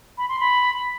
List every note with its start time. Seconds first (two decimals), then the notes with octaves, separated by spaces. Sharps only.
0.18 B5
0.29 C6
0.40 B5